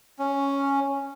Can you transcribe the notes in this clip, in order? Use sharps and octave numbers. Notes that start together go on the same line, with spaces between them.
C#4